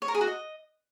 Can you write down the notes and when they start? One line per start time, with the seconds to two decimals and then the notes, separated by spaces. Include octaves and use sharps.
0.02 C#5
0.08 A#4
0.15 G#4
0.21 F#4
0.27 D#5